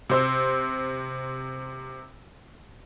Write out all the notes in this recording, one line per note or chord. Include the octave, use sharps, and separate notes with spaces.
C3 C5 E6